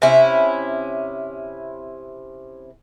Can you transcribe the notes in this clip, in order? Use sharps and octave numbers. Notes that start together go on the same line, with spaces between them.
C3 C#4 E4